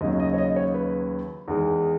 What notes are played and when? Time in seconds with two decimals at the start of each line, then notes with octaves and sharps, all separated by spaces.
0.01 D#2 C#3 F#3 D#5
0.20 D#5
0.34 C#5
0.38 D#5
0.56 C#5
0.74 B4
1.48 E2 D#3 G#3